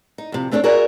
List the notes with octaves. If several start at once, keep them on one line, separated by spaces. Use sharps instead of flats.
D#4
F2 C3
A3 C4 D4 F#4 A4 C#5
F#4 G#4 A#4 C#5 D5 E5